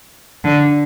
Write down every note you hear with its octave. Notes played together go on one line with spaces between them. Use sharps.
D3